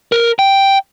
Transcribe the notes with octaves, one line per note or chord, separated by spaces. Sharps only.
A#4
G5